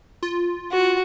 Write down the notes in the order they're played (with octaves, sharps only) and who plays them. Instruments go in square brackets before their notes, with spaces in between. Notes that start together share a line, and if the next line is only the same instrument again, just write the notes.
[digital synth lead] F4
[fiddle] F#4